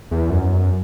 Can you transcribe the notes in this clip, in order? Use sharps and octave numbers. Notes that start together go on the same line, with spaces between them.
E2
F#2